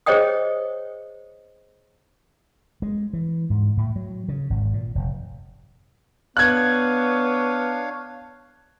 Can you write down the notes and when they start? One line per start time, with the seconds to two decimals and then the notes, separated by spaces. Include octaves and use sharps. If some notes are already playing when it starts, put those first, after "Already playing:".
0.06 G#4 C5 C#5 D#5 G5 D#6
2.82 G#3
3.13 E3
3.50 G#2
3.77 A2
3.96 F#3
4.28 C#3
4.50 G#1
4.74 A#2
4.95 F1
6.37 B3 D4 C#5 F5 F#6 G#6